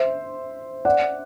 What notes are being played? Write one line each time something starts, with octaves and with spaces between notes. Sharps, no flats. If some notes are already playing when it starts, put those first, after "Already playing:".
Already playing: C5 E5
D5 F#5